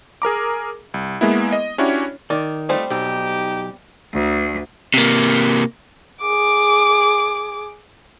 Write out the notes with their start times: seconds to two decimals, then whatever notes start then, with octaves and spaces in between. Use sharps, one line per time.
0.22 G#4 A#4 A#5 D6
0.94 C2
1.21 G#3 A#3 B3 E4
1.53 D#5
1.78 C#4 D4 E4 F#4 G4 C#5
2.30 D#3 D5
2.69 G3 A3 C4 D#4 F4 C5
2.90 B1 D#4 G4
4.13 D2
4.94 C3 A#3
6.21 G#4 D6